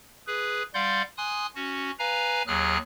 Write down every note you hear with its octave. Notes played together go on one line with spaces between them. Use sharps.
G#4 B4
G3 D5 F5 F#5 C6 G6
G#5 C6 D#6 F#6
C#4 F#4
B4 F5 G#5 A#5
D#2 F#3 G#4 F6 F#6